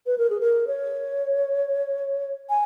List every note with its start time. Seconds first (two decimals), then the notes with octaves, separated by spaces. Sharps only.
0.06 B4
0.18 A#4
0.30 G#4
0.41 A#4
0.67 C#5
2.49 G#5